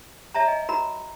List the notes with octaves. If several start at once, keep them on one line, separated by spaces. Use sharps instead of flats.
C#5 E5 A5 A#5
D#5 G#5
F#4 A#4 A#5 B5